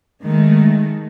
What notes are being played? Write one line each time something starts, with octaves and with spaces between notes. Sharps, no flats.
D#3 G#3 A3